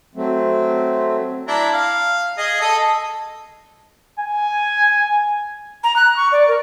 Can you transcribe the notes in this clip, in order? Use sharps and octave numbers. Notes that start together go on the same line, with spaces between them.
F#3 A3 C4
D4 E4 A#5
F5
G#4 D#5
A4 D#5
G#5
A#5
F#6
C#6
D5
A#4